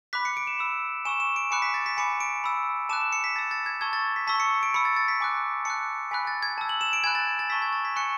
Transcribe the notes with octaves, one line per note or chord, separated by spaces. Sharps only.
B5 D6 F#6 B6
C#7
D7
E7
B5 E6
G#5 C#6 E6 E7
E7
D7
G#5 B5 D6 F#6 C#7
B6
A6
B6
G#5 B5 D6 C#7
D7
B5 E6
A5 D6 F#6 E7
E7
C#7
B6
A5 E6 A6
A6
G#6
A5 C#6 E6 G#6
A6
B6
A5 C#6 E6 B6
C#7
D7
B5 E6 C#7
A6
A6
B6
G#5 D6 F#6
A5 D6 F#6 C#7
G#5 B5 F#6 B6
A6
G#6
A5 E6
F#7
E7
D7
G#5 B5 F#6 G#6
A6
A6
A5 C#6 E6 B6
G#6
A6
B6
G#5 C#6 F#6 C#7